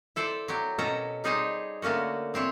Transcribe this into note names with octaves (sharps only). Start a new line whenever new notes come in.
E4 A4 C5 D5
F#3 G4
B2 C#4 A4 A#5
G3 D#4 G#4 C5 C#5
D3 A3 A#3 C#4 F#4
E3 C4 E4 C#5